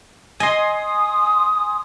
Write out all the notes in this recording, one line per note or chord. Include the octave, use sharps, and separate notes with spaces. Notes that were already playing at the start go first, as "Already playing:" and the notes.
D#5 G#5 C6 D#6